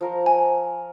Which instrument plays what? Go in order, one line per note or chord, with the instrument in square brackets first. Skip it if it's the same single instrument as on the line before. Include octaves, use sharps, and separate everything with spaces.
[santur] F3 A#4 A#5
[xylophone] G#5